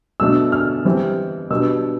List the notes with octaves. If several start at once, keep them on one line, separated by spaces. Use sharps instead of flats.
B2 A3 D4 E6
F6
E3 G3 C4
B2 G3 B3 D4 E6